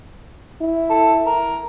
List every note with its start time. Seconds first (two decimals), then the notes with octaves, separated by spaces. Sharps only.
0.61 E4
0.90 A4
1.26 A#4